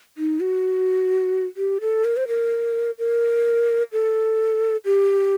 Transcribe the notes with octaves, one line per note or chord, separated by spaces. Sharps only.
D#4
F#4
G4
A4
A#4
C5
A#4
A#4
A4
G4